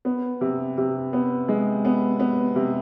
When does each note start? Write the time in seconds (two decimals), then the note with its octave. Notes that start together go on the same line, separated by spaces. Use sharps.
0.05 B3
0.41 C3
0.78 C3
1.13 B3
1.48 G#3
1.85 B3
2.20 B3
2.56 C3